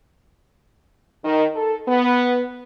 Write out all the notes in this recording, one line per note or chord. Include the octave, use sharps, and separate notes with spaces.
D#3
A4
B3